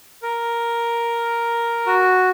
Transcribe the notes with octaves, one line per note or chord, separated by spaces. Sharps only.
A#4
F#4